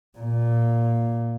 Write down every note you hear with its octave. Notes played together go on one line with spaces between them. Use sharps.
A#2